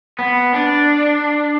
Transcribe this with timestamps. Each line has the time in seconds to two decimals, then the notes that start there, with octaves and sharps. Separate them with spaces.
0.19 B3
0.54 D4